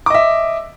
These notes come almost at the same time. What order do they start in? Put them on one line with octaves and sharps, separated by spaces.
D6 D#5 E5